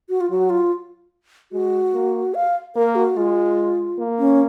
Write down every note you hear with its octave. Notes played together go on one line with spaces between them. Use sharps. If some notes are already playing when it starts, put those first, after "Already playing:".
F#4
F4
F#3 F#4
F4
G#3 F#4
A#3
F5
A#3 A#4
F#4
G#3 F4
A#3
C#4